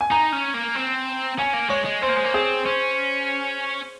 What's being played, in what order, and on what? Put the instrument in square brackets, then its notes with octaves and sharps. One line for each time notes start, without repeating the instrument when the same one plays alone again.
[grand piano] G#5
[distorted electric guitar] D#4 [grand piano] A#5
[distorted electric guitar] C#4
A#3
C4
[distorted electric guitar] C#4 [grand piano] G#5
[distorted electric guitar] A#3
[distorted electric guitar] G#3 [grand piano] C#5
[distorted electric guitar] G#3
[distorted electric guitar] C4 [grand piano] C5
[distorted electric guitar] A#3
G#3
A#3
[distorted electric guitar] C4 [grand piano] G#4
[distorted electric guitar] C#4 [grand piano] C5